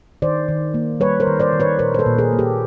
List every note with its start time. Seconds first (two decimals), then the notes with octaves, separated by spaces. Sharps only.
0.22 D#3 C5 D5
0.48 D#3
0.74 A#3
1.00 G3 B4 C#5
1.20 A#4 C5
1.27 D#3
1.40 C5 D5
1.53 D#3
1.60 B4 C#5
1.79 A#2 A#4 C5
1.94 C5
1.99 A4 B4
2.06 A#2
2.18 G#4 A#4
2.33 A#3
2.39 G4 A4